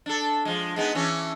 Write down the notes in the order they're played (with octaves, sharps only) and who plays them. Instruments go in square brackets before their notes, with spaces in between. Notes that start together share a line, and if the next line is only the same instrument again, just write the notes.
[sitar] D4 A4
F3 G#3
G#3 B3 D#4
E3 C#4 D4